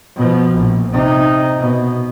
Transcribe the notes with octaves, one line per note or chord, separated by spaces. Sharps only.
B2 F3
A#1
C3 D#4
B2